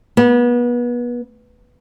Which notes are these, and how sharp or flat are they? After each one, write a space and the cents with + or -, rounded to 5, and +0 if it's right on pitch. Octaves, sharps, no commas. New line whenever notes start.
B3 -30